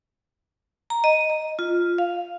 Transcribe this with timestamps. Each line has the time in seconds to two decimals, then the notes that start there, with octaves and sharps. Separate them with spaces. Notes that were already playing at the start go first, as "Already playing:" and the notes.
0.90 A#5
1.04 D#5
1.30 D#5
1.59 F4
1.98 F5